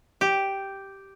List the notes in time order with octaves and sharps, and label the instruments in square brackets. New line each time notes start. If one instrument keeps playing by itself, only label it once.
[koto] G4